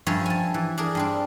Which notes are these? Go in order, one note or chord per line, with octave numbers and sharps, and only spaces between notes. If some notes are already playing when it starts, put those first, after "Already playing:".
G2 F3 C#4 A#4 C#5 E5
G#5 A5
E3
D4 G#4 A#4
G2 C4 D4